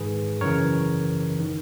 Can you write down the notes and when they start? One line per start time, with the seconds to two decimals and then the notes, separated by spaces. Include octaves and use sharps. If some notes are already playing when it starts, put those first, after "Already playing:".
Already playing: G#2 D#3 G#4 B4
0.41 F#2 C#3 E3 A#4 C#5
1.40 D#3